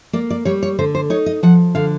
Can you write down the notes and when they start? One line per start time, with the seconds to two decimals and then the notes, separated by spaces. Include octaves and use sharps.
0.13 A#3 D5
0.30 D5
0.45 G3 C#5
0.63 C#5
0.79 D3 C5
0.95 C5
1.10 D#4 C#5
1.26 D#5
1.43 F3 F#5
1.75 D3 F5